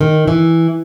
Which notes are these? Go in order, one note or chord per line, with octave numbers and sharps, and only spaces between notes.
D#3
E3